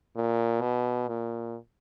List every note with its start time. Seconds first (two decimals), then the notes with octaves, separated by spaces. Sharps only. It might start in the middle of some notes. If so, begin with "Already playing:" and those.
0.16 A#2
0.61 B2
1.08 A#2